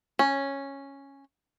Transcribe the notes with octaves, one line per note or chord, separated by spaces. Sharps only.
C#4